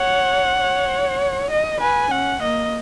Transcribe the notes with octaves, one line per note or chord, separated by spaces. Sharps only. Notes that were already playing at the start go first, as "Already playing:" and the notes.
Already playing: C#5 F#5
C#5
D#5
B4 G#5
C#4 F#5
A#3 D#5